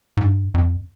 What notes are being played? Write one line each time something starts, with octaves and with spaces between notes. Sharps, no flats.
G#2
G2
F2